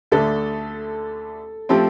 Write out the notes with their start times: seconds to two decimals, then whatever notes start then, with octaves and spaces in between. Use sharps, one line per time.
0.12 D2 D3 A3 A4
1.69 F3 A3 C4 G4